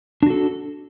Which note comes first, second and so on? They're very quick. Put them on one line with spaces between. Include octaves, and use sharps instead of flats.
D4 F#4 A4